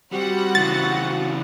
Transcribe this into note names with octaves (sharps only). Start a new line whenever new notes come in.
G3 C4 F#4 F#5
C#3 E3 A6